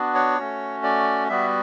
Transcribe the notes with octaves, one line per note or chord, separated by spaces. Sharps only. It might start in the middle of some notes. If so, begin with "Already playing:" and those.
Already playing: B3 D4 F#4
C#5
A3 C#4 F#4
D5
G3 B3 F#4 E5